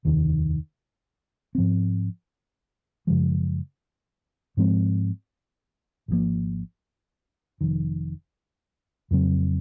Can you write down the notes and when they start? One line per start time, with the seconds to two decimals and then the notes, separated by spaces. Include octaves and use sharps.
0.05 F1 D#2 D#3
1.55 G#2 F3 C4
3.07 F#2 C#3 F3 G#3
4.57 G#2 F3 G#3 C4
6.08 G#1 G#2 F3 A#3
7.61 F1 F2 D#3
9.11 F2 C#3 F#3 C4